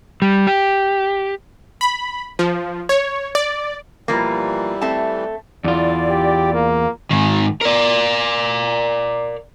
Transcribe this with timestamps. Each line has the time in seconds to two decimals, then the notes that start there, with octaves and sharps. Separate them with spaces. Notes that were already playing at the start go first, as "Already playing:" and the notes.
0.22 G3
0.47 G4
1.81 B5
2.39 F3
2.89 C#5
3.35 D5
4.08 B2 E3 F3 G3 A#3
4.81 A3 C4 A5
5.64 E2 E4 F4 D5
6.10 G4
6.53 A#3
7.11 G#2 D#3
7.62 A#4 D5